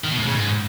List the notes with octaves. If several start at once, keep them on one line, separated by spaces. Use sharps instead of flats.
D#3
B2
A2
C#3
G#2